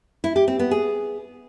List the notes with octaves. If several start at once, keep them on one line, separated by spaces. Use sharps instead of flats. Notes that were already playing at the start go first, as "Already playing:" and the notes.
E4
G4
C4
B3
G#4